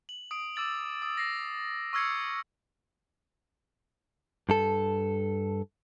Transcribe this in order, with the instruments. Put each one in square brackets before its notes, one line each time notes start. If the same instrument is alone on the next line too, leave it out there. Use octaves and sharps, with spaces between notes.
[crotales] F#7
D#6 D7
D6 E6 A6 F#7
D#6
A#6 C7
C#6 E6 F6 G#6 C7 C#7
[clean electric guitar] G2 A4